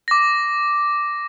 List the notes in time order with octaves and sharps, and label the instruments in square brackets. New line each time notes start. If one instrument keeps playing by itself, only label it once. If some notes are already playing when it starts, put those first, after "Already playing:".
[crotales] D6 A#6